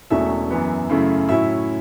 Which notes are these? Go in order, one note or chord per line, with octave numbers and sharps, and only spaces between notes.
E1 E2 B2 A3 C#4 E5
F#2 E3 B3
F#2 C#3 A3 E4
A2 F#3 C#4 E4 E5